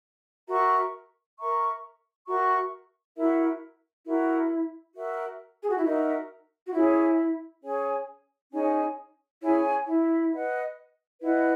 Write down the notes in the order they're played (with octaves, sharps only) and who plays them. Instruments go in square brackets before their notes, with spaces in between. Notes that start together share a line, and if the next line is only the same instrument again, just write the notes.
[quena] F#4 [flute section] A#4 E5 A#5 C#6
[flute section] A#4 E5 A#5 C#6
[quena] F#4 [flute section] A#4 E5 A#5 C#6
[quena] E4 [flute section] F#4 A#4 E5
[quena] E4 [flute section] F#4 A#4 E5
[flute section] F#4 A#4 E5
[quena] G#4
F#4
E4
[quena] D#4 [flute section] F#4 A#4 E5
[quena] F#4
[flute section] C#4 G#4 C#5 G#5 [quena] E4
[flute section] C#4 G#4 C#5 G#5
[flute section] C#4 G#4 C#5 G#5 [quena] D#4
[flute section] C#4 G#4 C#5 G#5 [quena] E4
[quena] E4
[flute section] B4 D#5 F#5
[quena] E4 [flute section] B4 D#5 F#5